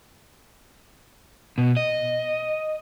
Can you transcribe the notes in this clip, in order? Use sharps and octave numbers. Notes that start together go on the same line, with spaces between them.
B2
D#5